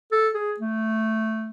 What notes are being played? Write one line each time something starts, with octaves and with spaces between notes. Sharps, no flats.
A4
G#4
A3